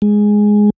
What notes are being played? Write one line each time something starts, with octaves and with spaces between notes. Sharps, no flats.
G#3